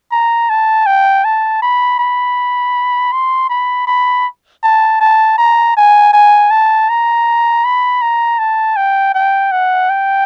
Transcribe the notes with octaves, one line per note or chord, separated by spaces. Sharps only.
A#5
A5
G5
A5
B5
B5
C6
B5
B5
A5
A5
A#5
G#5
G#5
A5
A#5
B5
A#5
A5
G5
G5
F#5
G5